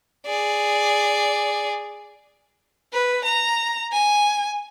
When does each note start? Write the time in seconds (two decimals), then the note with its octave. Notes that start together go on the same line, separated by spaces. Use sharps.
0.26 G#4 D5
2.93 B4
3.25 A#5
3.92 G#5